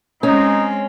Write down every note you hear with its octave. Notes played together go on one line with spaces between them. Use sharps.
G#3 C4 C#4 D#4